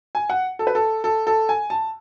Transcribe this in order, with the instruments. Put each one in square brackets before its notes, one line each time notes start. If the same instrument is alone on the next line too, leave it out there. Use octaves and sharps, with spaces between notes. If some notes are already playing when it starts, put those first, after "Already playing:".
[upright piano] G#5
F#5
A4
B4
A4
A4
A4
G#5
A5